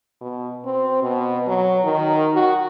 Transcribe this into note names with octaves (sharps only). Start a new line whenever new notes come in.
B2
C4
B2
F#3
D#3
F#4